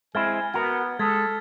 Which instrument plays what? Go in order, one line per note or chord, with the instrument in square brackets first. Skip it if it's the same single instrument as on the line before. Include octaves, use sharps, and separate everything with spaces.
[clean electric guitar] G#3 C4 E4 [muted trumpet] G#5 [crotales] F6 G#6 A6
[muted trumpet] B3 [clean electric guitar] F#4 A#4
[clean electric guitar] G#3 [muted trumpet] A4 [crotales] G#6 A6 B6